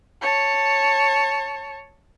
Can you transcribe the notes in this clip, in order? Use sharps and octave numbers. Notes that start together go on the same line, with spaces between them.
C#5 A5